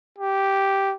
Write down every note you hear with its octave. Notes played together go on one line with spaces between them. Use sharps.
G4